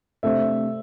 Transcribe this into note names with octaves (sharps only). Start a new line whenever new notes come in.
C3 A3 D4 C5 E5